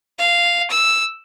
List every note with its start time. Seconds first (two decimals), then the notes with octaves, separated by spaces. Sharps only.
0.18 F5
0.70 E6